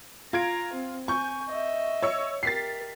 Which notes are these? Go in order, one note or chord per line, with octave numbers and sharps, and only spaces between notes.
F4 A#5 G#6 D7
C4
G#5 C#6 G6
D#5 E5
C#5 E6 C#7
G4 A#4 A6 B6 C7